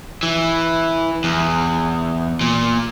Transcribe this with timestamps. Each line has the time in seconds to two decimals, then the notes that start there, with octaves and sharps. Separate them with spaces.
0.23 E3
1.24 E2
2.41 A#2